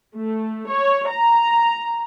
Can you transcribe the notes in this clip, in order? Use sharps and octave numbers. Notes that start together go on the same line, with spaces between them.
A3
C#5
A#5